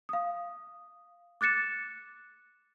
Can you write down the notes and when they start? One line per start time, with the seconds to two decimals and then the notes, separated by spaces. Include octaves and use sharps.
0.09 F5 D#6
1.41 D6 F#6 A6 C#7 E7